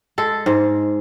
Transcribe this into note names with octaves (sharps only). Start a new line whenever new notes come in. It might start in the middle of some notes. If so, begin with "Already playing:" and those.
G#3 A4
G#2